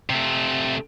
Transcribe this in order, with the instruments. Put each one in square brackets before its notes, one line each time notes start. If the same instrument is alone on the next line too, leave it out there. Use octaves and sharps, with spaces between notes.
[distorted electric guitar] C3 A3